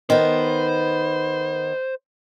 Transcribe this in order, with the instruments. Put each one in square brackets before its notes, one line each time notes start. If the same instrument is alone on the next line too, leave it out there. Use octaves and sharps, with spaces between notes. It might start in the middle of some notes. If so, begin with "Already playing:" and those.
[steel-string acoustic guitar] D#3 B3 [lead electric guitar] C5